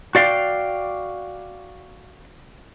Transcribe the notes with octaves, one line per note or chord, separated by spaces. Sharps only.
F#4 D5 F5 G5